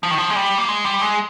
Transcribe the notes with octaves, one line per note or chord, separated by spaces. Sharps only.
F3
D#3
F3
G#3
G3
A#3
G#3
G3
G#3